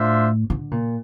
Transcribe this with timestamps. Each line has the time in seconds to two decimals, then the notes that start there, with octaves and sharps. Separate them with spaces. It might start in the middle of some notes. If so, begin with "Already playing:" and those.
Already playing: A2 D4 F4 C5 E5
0.50 D3
0.71 A#2